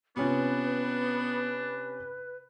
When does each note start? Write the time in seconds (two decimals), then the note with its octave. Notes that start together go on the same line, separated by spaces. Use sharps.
0.16 C3 B3 C#4 D4 F4 B4